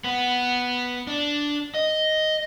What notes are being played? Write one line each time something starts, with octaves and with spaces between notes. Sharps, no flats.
B3
D4
D#5